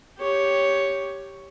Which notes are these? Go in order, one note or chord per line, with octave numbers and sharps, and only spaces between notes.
G4 C#5